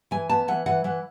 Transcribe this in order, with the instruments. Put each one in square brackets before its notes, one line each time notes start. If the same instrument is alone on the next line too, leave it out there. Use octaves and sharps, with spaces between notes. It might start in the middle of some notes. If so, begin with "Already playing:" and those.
[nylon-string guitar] E3 G#5
B3 A5
E3 F#5
E3 F#5
E3 F#5